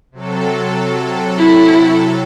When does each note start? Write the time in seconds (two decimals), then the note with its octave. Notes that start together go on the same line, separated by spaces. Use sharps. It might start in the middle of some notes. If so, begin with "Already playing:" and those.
0.12 C3 F#3 A4
1.38 E4